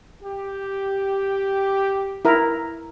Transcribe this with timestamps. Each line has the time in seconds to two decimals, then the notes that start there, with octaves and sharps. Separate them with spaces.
0.23 G4
2.25 E4 A#4